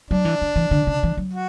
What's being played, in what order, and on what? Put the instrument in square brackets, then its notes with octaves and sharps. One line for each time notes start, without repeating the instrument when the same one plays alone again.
[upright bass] F#3 [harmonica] D4
[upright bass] E3
D3
E3
D3
C#3
E3
F#3
[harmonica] F#4